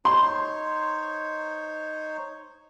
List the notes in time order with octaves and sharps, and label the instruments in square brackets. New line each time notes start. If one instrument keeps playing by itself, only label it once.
[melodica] D#4 C5 C#5 [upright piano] C6